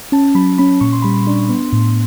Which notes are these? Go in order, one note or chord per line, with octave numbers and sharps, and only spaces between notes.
C#4 A5
F#3 B5
C#4 B5
A#2 C#6
C6
G3 B5
C6
D4
B3
A2